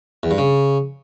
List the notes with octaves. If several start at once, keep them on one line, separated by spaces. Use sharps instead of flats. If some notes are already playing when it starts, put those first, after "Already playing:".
E2
G2
C#3